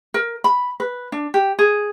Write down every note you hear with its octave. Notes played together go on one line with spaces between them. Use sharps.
A#4
B5
B4
D4
G4
G#4